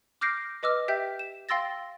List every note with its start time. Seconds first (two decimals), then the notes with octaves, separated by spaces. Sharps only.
0.21 D6 F6 G6 A#6 C7 D7
0.63 B4 D#5 D6 E6 F6
0.88 G4 E5 G5 G6 B6
1.19 E7
1.49 F5 G5 C6 E6 A6 A#6